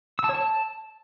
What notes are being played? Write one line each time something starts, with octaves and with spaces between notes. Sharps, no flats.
E6
A5
C#5
A5